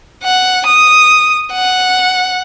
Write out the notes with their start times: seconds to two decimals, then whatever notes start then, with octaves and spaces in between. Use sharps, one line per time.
0.24 F#5
0.66 D#6
1.52 F#5